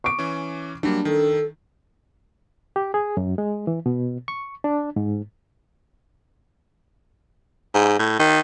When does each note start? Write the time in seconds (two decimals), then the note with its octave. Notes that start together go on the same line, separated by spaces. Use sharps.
0.04 C#6 D6 D7
0.19 E3 C#4
0.83 F#3 G3 A#3 D4
1.05 D#3 A4
2.76 G4
2.94 G#4
3.17 F#2
3.38 G#3
3.67 E3
3.86 B2
4.28 C#6
4.64 D4
4.96 G#2
7.74 G#2
7.99 A2
8.19 D#3